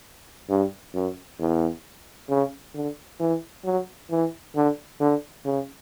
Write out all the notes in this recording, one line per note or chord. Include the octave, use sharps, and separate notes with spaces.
G2
F#2
E2
C#3
D3
E3
F#3
E3
D3
D3
C#3